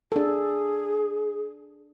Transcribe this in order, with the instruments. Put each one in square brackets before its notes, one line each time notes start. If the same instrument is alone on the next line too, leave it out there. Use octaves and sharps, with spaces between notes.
[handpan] D4 A4 [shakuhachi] G#4